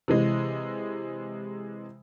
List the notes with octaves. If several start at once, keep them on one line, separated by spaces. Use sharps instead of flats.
C3 E3 G#3